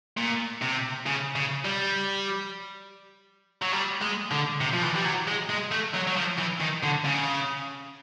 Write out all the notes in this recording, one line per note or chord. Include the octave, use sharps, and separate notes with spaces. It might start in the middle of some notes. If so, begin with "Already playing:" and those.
A#2
C3
C#3
C#3
G3
F#3
G3
G#3
D3
C3
F3
E3
G3
F#3
G#3
G#3
A3
F#3
F#3
F3
E3
D#3
D3
C#3